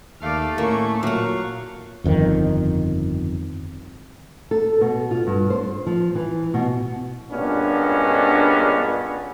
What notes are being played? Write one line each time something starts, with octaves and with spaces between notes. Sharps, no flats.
D#2 A3 D5 F5
A2 A#3 C#4 C#6
A#2 F#3 F5 F#5 C#6
G1 F2 C3 D#3
A4
B2
F4
G2
C5
F3
E3
B2
G2 A#2 G#3 B3 C#4 D4